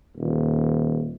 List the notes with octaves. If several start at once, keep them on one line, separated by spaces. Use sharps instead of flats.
D#1